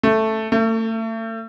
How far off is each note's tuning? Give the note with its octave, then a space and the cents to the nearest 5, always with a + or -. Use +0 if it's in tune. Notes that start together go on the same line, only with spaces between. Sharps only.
A3 +0
A3 +35